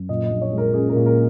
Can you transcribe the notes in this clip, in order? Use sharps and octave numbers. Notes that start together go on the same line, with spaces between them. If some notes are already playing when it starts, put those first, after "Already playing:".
Already playing: F#2
A#2 D#5
D#5
A#1
C#5
G#3
A#4
C#4 G#4
A#4
A#2 G#4
A#4